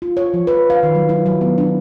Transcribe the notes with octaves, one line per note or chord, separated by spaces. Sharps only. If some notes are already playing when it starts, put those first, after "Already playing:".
F4
C#5
F3
B4
F5
D#3
F#3
E4
F#3
B3
D4